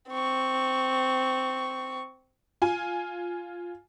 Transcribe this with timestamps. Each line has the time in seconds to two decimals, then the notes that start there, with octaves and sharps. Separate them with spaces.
0.10 C4 C#6
2.62 F4 G#5